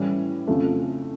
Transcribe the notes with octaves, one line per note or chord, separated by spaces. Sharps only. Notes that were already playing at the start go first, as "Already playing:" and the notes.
Already playing: A2 E3 G3 C#4
F2 C#3 F3 A3